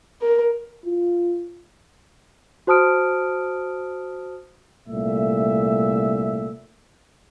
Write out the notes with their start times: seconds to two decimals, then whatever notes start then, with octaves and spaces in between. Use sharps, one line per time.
0.22 A#4
0.86 F4
2.67 F#4 C5 A5 D#6 F6 D7
4.87 C2 A#2 A3 E5